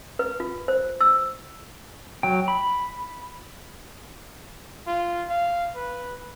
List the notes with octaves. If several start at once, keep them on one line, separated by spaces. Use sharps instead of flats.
B4
F4
C5
E6
F#3 G5
B5
F4
F5
B4